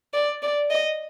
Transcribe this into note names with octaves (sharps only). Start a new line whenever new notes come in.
D5
D5
D#5